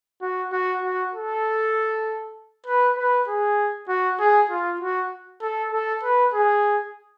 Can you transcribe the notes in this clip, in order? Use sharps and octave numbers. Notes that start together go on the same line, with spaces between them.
F#4
F#4
F#4
A4
B4
B4
G#4
F#4
G#4
F4
F#4
A4
A4
B4
G#4